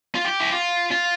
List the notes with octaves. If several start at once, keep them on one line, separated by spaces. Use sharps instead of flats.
F4
G4
E4
F4
F4